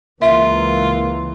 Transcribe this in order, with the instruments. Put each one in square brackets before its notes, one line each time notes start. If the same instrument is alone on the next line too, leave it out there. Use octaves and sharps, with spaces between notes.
[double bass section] C#2 E3 [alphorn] A#3 [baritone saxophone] F4 [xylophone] E5